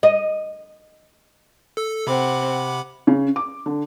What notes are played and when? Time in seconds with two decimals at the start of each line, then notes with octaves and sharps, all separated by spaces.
0.03 D#5
1.77 A4 E6
2.07 C3 C4 F#5 B5 D6
2.50 F#5
3.07 C#3
3.36 D6
3.66 D3